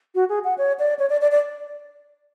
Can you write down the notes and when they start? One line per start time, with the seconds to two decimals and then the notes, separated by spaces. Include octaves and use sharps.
0.15 F#4
0.29 G#4
0.44 F#5
0.58 C#5
0.79 D5
0.99 C#5
1.10 D5
1.21 D5
1.31 D5